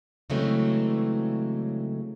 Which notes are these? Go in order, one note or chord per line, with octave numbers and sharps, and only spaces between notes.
C#3 E3 F#3 G#3 A3 C4